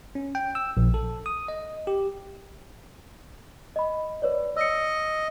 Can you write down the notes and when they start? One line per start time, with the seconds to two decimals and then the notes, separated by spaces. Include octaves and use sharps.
0.15 C#4
0.35 G5
0.55 E6
0.77 A#1
0.94 A4
1.26 D#6
1.48 D#5
1.87 G4
3.76 D#5 B5
4.22 B4 C#5 D5
4.57 D#5 E6 C#7